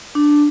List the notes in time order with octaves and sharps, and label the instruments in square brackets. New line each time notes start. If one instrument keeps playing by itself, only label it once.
[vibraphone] D4